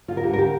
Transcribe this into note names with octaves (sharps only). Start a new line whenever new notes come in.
D2 F4
A#4
D3 G4
A#4
G4